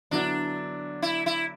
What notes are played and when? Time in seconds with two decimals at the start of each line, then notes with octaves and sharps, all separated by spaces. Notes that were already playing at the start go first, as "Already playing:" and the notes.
0.11 D3 F#3 B3 D4 E4
1.02 E4
1.26 E4